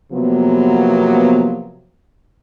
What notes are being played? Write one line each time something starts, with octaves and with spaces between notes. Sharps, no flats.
C3 F3 F#3 A#3 B3